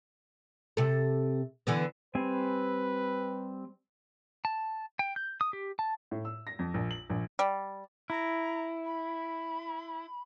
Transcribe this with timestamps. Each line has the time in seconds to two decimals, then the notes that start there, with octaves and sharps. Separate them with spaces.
0.77 C3 A4
1.67 D3 E3 B3
2.15 G3 C4 B4 G#5
4.45 A5
4.99 G5
5.16 G6
5.41 D#6
5.53 G4
5.79 A5
6.11 A2
6.25 E6
6.47 A#6
6.59 F2
6.74 A#1
6.91 F#7
7.10 A#1
7.39 G3
8.10 E4 A#5
8.85 B5